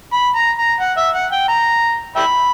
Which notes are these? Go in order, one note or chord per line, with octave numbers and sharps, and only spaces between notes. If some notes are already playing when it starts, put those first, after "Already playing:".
B5
A#5
A#5
F#5
E5
F#5
G5
A#5
E5 G5 B5